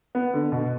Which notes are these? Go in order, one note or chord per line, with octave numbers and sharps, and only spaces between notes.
B3
D3
B2